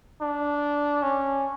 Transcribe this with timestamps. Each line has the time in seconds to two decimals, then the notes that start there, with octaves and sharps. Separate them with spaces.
0.21 D4
1.03 C#4